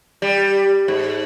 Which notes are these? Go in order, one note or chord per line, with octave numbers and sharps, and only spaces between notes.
G3
G#2